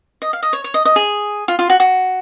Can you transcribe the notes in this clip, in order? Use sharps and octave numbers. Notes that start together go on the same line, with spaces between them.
D#5
F5
D#5
C#5
C#5
D#5
D#5
G#4
F4
F4
F#4
F#4